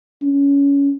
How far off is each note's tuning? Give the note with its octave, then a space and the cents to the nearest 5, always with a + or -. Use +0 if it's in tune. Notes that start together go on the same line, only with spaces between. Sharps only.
C#4 +20